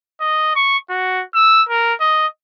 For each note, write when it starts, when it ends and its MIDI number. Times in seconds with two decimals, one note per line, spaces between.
0.21 0.54 75
0.56 0.77 85
0.90 1.23 66
1.34 1.63 88
1.69 1.94 70
2.00 2.27 75